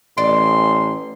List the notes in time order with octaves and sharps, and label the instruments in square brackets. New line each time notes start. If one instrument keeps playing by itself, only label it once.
[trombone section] A1 [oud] D5 [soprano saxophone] C6